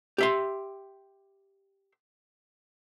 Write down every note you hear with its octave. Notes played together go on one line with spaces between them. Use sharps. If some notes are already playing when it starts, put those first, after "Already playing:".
G4 E5 C6